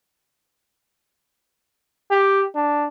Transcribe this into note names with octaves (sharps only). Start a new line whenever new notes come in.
G4
D4